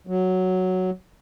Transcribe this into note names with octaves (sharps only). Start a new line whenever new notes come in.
F#3